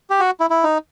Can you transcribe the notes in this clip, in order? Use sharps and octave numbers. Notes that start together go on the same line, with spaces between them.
G4
F#4
E4
E4
D#4